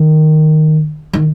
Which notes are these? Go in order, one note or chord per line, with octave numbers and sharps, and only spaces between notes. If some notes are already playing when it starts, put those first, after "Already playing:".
Already playing: D#3
D#3